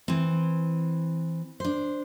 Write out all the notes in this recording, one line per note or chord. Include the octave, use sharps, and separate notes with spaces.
E3 C4
D4 C5